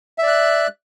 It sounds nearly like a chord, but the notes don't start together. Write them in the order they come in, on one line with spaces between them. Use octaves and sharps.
E5 D5 F#6